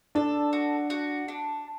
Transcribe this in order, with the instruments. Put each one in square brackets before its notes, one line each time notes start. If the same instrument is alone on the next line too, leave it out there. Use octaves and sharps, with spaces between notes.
[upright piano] D4 [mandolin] A4
[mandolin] F#4
F#4
D4